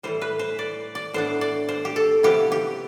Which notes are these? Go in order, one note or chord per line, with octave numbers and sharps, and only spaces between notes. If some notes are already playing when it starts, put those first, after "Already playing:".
A2 E3 G3 C5
B4
C5
D5
D5
A2 E3 B3 D4 C5
D5
C5
G4
A4
C3 F3 B3 E4 G4
G4